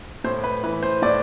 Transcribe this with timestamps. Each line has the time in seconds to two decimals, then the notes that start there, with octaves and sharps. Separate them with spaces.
0.24 A2 C5
0.44 B4
0.63 E3 B4
0.83 C5
1.02 A2 D5